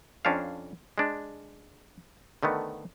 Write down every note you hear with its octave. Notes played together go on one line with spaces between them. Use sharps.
F2 C#4 D4 C5 F5
G#3 D4
D3 D#3 A3 B3